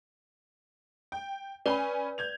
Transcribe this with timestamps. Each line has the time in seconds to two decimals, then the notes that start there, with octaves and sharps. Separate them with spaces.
1.12 G5
1.66 C#4 B4 D5 G#5 B5
2.18 G6 G#6 F7